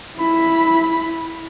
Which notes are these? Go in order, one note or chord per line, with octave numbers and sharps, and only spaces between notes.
E4 B5